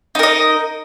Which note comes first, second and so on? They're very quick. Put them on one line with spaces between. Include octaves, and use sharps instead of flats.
D#4 A#4 D#5